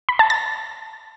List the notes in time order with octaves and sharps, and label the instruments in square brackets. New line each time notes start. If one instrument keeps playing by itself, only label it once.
[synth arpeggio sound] B5
A5
A6